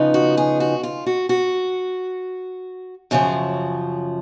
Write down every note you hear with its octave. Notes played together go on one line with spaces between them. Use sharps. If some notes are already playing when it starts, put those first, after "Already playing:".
Already playing: C#3 F3 B3 D#4
F#4
G#4
F#4
F4
F#4
F#4
F#2 C#3 F3 G#4